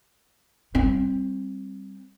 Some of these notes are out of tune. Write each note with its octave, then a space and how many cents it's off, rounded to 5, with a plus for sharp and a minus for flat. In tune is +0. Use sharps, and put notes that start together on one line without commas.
G3 +0 C4 +20